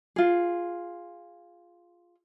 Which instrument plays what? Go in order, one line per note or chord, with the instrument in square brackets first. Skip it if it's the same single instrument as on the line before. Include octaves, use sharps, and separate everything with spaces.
[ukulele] F4 G#4